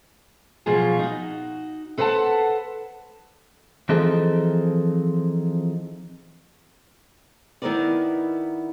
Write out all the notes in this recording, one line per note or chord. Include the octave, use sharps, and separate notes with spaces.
B2 F3 F#3 B3 F4 G#4
D#4 F#4
A4 B4 C5 D#5 F#5 A5
E3 F3 C4 D#4 G#4 A4
D#3 B3 E4 A#4 B4 D5